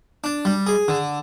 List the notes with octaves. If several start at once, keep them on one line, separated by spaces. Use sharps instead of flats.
D4
G3
G#4
D3